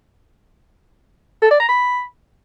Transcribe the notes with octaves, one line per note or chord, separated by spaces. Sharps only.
A4
D5
A#5
B5